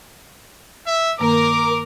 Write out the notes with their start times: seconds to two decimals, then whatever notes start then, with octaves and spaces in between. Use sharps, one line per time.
0.87 E5
1.20 G2 D#3 A#3 A#4 D6